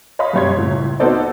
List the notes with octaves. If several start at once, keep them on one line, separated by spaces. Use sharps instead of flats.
C#5 D#5 F5 B5
F#2 B2 G3 C#5 C6 G#6
C#2 A2
B3 D#4 F#4 A4 C5 D5